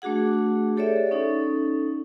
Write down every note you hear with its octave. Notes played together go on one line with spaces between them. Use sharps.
A3 D4 F#4 G#4 F#5
G4 A4 C#5 D5 E5
C#4 D#4 A4